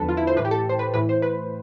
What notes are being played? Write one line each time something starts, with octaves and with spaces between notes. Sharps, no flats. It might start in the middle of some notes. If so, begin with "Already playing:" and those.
Already playing: E2 D3 F3 A4 B4
F4
E4
C5
A2 E3 B4
G4
A4
C5
B4
A2 E3 B4
C5
B4